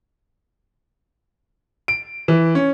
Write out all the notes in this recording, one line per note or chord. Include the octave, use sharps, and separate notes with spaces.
D7
E3
C#4